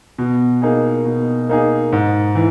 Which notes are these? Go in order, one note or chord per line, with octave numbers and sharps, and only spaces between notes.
B2
A#3 D#4 G#4
B2
A#3 D#4 G#4
G#2
E3